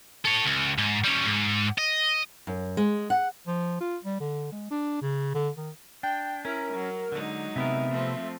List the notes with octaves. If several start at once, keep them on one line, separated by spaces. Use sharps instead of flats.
A4 C#5
C#2
G#2
G3 C#4
G#2
D#5
F#2
G#3
F#5
F3
F4
G3
D3
G#3
D4
C#3
D3
D#3
D4 G5
C#4 E4 A#4
F#3
D3 F#3 G#3 D#4
C3 B3 A#4 E5
F3 A3 C4